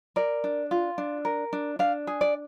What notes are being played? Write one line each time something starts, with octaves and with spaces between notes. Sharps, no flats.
A#4 D5
D4
F4
D4
A#4
D4
D4 F5
G#4
D5